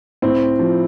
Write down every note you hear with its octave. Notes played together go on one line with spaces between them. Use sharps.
A2 C4
F3